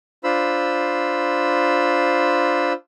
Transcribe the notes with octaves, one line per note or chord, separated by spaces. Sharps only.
D4 F4 C5 B5 E6